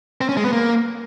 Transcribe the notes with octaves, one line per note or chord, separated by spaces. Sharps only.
C4
C#4
G#3
B3
A#3